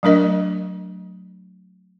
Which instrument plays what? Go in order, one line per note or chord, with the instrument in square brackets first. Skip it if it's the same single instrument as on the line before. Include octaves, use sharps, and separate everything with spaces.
[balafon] F#3 A3 D4 A#4 D#5